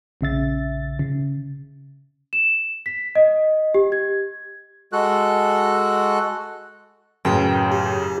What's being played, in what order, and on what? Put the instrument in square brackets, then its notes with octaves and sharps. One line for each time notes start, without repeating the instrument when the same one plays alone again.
[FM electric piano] A#1 C#3 E5 A6
C#3
[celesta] E7
B6
D#5
G4
G#6
[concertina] G#3 F#4 A4 F#6
[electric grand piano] F#2 C#3 [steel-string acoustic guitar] A2 B4 G5
[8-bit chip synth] G4